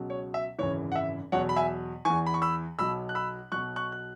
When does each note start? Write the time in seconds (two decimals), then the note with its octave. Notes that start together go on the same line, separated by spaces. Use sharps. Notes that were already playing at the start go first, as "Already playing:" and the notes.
Already playing: C#2 B2 F#3
0.10 C#5
0.34 E5
0.59 G#1 F#2 C#3 E3 C#5
0.92 F#5
0.96 E5
1.32 E2 B2 F#3 C#5 F#5
1.49 B5
1.56 E5 G#5
2.05 E2 E3 G#5 C#6
2.26 B5
2.34 C#6
2.42 B5 E6
2.79 B1 B2 F#3 B5 E6
3.09 F#6
3.15 B5 E6
3.52 B1 B2 F#3 C#6 F#6
3.76 C#6 F#6
3.92 F#6